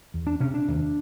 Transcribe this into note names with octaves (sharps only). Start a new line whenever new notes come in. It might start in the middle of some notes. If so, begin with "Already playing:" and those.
E2
D4
C3 C#4
D4
D#2